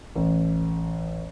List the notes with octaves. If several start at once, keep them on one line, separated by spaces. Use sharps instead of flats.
A1